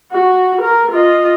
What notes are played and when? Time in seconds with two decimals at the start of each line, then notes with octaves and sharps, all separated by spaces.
0.12 F#4
0.62 A#4
0.92 F4 D#5